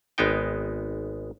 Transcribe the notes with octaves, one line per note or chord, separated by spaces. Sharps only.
G#1 G#3 B3 D#4 G5